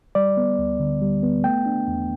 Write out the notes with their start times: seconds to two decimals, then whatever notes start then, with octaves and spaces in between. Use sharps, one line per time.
0.15 G3 D5
0.37 B3
0.59 D2
0.79 D3
1.02 G3
1.23 B3
1.44 A3 G5
1.66 D4
1.88 E2